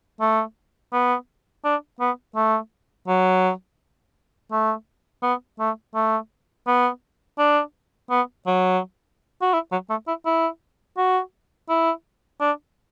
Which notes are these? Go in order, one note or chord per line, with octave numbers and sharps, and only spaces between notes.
A3
B3
D4
B3
A3
F#3
A3
B3
A3
A3
B3
D4
B3
F#3
F#4
E4
F#3
A3
E4
E4
F#4
E4
D4